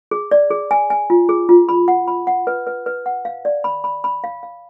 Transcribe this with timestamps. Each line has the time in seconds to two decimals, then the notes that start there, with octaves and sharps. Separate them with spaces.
0.11 G#4
0.31 D5
0.51 G#4
0.71 G#5
0.90 G#5
1.10 F4
1.29 G#4
1.49 F4
1.69 B5
1.88 F#5
2.08 B5
2.27 F#5
2.47 B4
2.67 B4
2.86 B4
3.06 F#5
3.25 F5
3.45 D5
3.64 B5
3.84 B5
4.04 B5
4.24 F5
4.43 F5